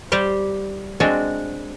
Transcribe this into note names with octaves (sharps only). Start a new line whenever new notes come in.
G3 G4 C5
G#3 C4 D4 F#4